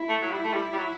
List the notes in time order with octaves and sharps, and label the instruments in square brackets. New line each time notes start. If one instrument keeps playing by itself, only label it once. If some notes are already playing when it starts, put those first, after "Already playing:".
Already playing: [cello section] E4
[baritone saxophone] A3
F#3
G3
A3
G3
G3
F#3